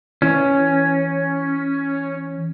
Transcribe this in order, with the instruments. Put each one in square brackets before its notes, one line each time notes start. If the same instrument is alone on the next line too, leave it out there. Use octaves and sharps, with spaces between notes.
[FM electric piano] E3 [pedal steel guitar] C#4